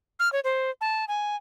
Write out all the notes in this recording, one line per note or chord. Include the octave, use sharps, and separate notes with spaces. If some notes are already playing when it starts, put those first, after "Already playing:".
F6
C#5
C5
A5
G#5